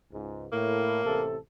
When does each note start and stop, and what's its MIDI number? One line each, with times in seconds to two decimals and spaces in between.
0.12 0.48 37
0.12 0.48 44
0.52 1.01 45
0.52 1.21 58
1.05 1.37 33
1.05 1.37 48
1.05 1.37 69